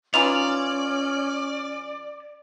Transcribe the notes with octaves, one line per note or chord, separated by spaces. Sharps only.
E3 C#4 D#4 F4 D5 F7